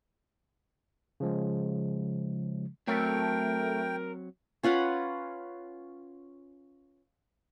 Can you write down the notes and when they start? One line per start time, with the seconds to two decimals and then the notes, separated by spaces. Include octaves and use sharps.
1.20 C#3 F3 G#3
2.87 F#3 A3 C4 A#4 C#5 G5
4.63 C#4 F4 B4 F#5